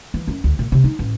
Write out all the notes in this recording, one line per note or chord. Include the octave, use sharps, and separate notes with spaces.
E3
F#2
D2
A#2
C3
D#4
A1